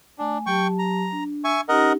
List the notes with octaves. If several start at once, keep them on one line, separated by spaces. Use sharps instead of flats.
A3 D4 G#5
F#3 G4 G5 A5 C#6
A#5
D4
E5 G#5 C#6
C#4 D#4 G4 A#4 D#5 F#5